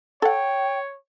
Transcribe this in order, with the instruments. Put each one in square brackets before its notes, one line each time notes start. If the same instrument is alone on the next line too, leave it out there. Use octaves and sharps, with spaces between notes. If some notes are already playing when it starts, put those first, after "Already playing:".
[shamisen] A4 F#5 [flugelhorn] C#5 [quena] G5